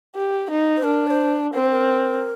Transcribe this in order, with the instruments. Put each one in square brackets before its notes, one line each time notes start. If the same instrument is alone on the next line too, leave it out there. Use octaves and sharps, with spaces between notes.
[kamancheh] G4
D#4
[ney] C5
[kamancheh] D4 [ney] A#4
[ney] D5
C5
[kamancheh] C4 [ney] A#4
[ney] C5
A#4